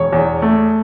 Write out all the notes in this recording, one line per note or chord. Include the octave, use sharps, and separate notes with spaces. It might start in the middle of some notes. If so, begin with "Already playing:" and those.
Already playing: E1 C#5
E2
A3